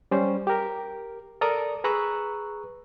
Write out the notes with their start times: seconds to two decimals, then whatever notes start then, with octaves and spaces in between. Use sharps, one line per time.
0.11 G3 C#4 C5
0.47 G4 A#4
1.41 A4 A#4 D5 A#5 D#6
1.84 G#4 B4 A#5 C#6 E6 F#6